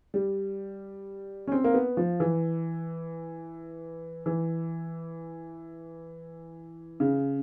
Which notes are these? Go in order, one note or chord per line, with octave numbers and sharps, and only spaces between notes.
G3
C#4
C4
A#3
B3
F3
E3
E3
C#3